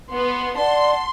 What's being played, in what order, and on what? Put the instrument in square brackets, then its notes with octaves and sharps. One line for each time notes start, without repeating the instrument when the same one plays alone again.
[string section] B3 [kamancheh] C6
[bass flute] D5 [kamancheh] F#5 A5 [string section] C6